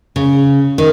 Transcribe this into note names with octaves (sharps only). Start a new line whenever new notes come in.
C#3
D#3